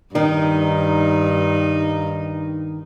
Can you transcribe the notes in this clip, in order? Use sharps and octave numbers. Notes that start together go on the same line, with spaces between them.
G2 D#3 D#4